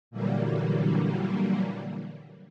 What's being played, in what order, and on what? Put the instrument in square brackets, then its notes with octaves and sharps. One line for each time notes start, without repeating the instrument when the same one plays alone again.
[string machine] A#2 D3 E3 F#3 G3 A#3